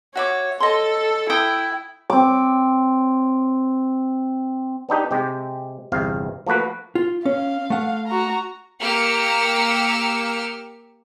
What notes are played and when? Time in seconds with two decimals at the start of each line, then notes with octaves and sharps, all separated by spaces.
0.15 F#4 C#5 E5 D6
0.60 A4 D#5 C6
1.30 E4 E5 G5 D#6
2.10 C4 D6
4.89 B3 D4 D#4 G4
5.11 C3 G#3 G4
5.92 G1 E2 C3 F5
6.47 F3 A3 A#3 F#4 B4
6.95 F4
7.25 C#4 F5
7.70 A3 F#5
8.07 F#4 A#5
8.81 A#3 G4 E6 F6 C#7